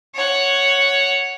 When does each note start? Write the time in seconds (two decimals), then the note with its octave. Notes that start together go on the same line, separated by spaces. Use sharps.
0.15 C#5 F#5